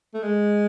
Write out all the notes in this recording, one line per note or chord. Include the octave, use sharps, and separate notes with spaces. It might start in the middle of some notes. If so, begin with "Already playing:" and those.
A3
G#3